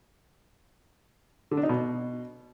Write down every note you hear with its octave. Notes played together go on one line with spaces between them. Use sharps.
D3
D4
D#4
B2